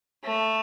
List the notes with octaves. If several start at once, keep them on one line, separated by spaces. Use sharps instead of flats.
A3